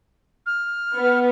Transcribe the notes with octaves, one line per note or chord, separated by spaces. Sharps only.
F6
B3